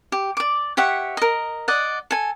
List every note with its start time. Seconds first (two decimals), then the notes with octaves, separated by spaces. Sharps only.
0.12 G4
0.37 D5 D6
0.77 G4 C#5 E5 F#5
1.17 A#4 D#5
1.68 D5 D#5 F#5
2.11 A4 G#5